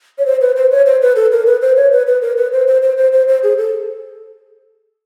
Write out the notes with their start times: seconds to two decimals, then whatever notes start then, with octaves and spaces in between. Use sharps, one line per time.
0.18 C#5
0.26 C5
0.41 B4
0.56 C5
0.71 C#5
0.86 C5
1.02 B4
1.16 A4
1.32 A#4
1.46 B4
1.61 C5
1.76 C#5
1.92 B4
2.07 B4
2.22 A#4
2.37 B4
2.52 C5
2.67 C5
2.82 C5
2.97 C5
3.12 C5
3.28 C5
3.43 G#4
3.58 A4